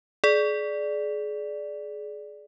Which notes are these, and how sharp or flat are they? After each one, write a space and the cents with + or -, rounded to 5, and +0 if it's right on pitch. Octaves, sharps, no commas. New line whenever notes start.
G#4 +30 D5 +0